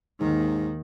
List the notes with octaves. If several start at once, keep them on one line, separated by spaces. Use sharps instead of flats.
D#2 G#2 D#3